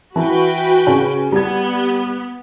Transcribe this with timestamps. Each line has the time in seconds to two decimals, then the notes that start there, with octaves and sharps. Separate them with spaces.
0.16 E3 F#4 B4 G5
0.87 C#3 C#4
1.32 G3 B3 G#6